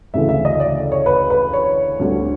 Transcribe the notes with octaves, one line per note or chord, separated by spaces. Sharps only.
D2 C#3 E3 A3 E5
E5
D#5
D5
C#5
B4
B4
C#5
D2 D3 G3